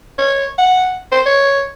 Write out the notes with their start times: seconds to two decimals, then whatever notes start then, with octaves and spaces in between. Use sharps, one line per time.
0.18 C#5
0.58 F#5
1.12 C5
1.26 C#5